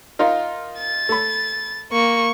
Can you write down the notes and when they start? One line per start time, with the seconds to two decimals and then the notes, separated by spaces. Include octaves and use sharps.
0.19 D#4 F4 A#4
0.78 A6
1.09 A3 B5
1.92 A#3 C#6